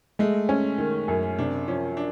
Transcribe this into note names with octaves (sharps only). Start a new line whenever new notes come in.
G#3 A3
C#4
D#3
F#2
C3 D4
F3 C#4
D4